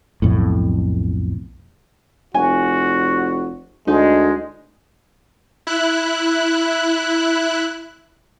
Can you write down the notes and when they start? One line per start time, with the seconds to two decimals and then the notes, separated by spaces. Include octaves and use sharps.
0.22 B1 F2 A2
2.34 F1 F#4 G#5
3.87 D2 G#3 D#4
5.67 E4 F#6